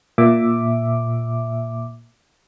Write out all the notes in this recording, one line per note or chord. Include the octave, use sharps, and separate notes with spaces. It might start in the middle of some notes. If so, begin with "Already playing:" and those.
A#2 E5 D6